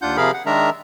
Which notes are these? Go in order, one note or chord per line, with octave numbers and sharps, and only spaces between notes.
D#2 D4 F4 F#5 G6
C3 F3 G#4 A#4 F5 B5
F#5
D#3 G#3 D4 A#4 E5 A#5